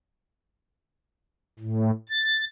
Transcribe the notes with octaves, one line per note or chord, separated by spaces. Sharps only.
A2
A6